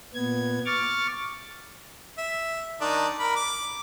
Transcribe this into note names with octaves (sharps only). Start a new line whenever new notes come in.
A#2 B3 G#6
C#6 D6 F6 A6
E5
D#3 D4 D#4
A#4 B5
D6